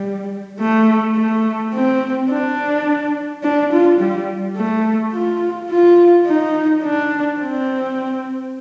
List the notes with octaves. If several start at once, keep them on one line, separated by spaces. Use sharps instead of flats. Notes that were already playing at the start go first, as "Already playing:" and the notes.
Already playing: G3
A3
A3
C4
D4
D4
F4
G3
A3
F4
F4
D#4
D4
C4